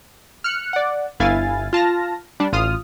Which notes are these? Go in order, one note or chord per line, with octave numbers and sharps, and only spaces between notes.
F6 F#6 C#7
D5 F#5
G1 E4 F5 G#5 A6
F4 A5 F6 A#6
G3 D4
A1 F4 D#6 F6